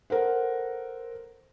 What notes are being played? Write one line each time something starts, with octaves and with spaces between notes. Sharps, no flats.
A4 A#4 C5 F#5